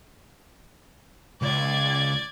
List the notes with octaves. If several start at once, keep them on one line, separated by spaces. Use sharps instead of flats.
C#2 D5 G#6